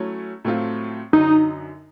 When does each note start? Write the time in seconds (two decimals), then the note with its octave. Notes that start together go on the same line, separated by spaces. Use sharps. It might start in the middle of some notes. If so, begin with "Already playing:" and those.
Already playing: F#3 A3 C#4 E4
0.45 A2 F#3 A3 C4 F4
1.13 F#2 D3 F#3 D#4